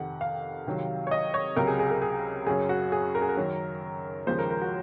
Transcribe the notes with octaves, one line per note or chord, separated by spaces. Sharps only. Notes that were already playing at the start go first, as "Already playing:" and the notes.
Already playing: F2 C3 D#3 F#5
F5
C2 C3 D#3 F#3
C#5
D#5
C#5
C#2 C3 F#3 A#4
G#4
G#4
A#4
G#4
F#2 C#3 F#3 G#4
F#4
G#4
A#4
G#4
A#4
F#2 D#3 F#3
D#2 C#3 F3 G#3 C5
A#4
A#4
F#4